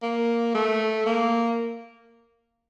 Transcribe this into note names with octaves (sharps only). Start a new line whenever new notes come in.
A#3
A3
A#3